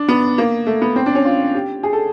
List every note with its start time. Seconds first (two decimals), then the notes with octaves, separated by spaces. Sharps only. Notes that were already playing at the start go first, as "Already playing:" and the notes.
Already playing: D4
0.08 B3
0.38 A#3
0.67 A3
0.82 B3
0.96 C4
1.06 D4
1.15 C#4
1.25 F4
1.54 G4
1.83 G#4
1.93 A4